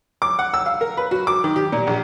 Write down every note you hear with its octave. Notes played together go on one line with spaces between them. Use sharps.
D6
F#5
E6
F5
A#4
B4
F#4
D6
D#3
G4
A#2
A#1